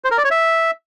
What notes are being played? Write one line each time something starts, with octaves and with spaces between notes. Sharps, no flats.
C5
A#4
D5
C#5
E5